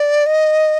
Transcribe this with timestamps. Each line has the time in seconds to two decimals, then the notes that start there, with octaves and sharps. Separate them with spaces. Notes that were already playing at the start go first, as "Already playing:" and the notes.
Already playing: D5
0.26 D#5